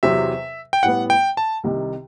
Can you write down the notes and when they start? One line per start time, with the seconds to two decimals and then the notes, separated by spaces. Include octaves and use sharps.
0.03 E2 C3 F#3 C4 E5
0.73 G5
0.83 A2 G3 B3 F#5
1.10 G5
1.37 A5
1.63 C2 C3 D#3